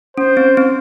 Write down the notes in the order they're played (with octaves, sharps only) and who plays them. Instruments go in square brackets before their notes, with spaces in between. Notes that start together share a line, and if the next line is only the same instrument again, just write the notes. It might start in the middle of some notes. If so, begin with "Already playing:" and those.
[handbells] C#4 [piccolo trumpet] C5
[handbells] C4
C4